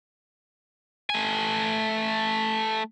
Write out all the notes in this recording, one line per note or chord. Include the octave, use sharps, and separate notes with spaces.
A3 G#5